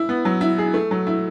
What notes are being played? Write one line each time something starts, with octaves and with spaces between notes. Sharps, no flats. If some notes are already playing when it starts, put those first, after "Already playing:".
Already playing: E4
B3
F#3
E4
G#4
A3
F#3
E4